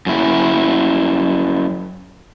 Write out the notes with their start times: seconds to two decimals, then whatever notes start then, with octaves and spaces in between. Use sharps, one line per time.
0.06 F#2 E4